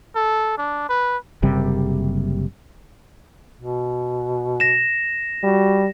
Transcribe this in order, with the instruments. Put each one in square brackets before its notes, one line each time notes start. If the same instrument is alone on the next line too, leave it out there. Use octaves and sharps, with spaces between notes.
[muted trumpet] A4
D4
B4
[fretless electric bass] F#1 C3 G3
[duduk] B2
[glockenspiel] A#6 E7
[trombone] G3 [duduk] F#4